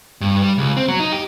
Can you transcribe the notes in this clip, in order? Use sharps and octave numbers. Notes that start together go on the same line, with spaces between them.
G2
G3
C#2
C4
F#3
D#4
G4